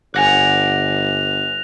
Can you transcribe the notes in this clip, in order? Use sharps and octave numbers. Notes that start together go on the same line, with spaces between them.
G1 D5 F#5 G#5 F#6 A#6 F7